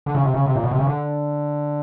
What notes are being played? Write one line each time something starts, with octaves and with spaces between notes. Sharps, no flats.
D3
C#3
C3
C#3
C3
A#2
B2
C3
C#3
D3